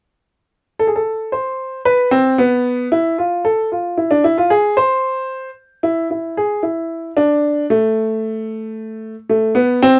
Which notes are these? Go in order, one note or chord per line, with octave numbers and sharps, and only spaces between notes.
A4
G#4
A4
C5
B4
C4
B3
E4
F4
A4
F4
E4
D4
E4
F4
G#4
C5
E4
E4
G#4
E4
D4
A3
A3
B3
C4